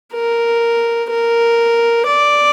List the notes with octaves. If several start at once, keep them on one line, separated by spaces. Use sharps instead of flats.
A#4
A#4
D5